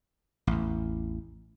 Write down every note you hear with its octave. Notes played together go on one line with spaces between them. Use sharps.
A1 E2